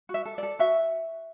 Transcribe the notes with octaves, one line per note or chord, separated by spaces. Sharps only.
F#4
E5
A4
A4 D5
F#4 E5